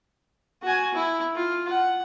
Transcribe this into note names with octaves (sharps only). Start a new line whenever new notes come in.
F#4 G#5
E4
F4
F#5